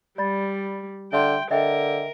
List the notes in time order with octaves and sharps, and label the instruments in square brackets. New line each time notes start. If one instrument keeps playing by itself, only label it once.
[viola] G3 [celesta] D5 B5 A6
[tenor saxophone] D3 [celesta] E5 C6 [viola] G5
[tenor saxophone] D3 [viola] A#4 [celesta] D#5 E5 G5